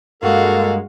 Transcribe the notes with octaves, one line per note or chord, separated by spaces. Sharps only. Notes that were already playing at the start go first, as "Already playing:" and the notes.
G2 G#3 A#3 F#4 A4 F5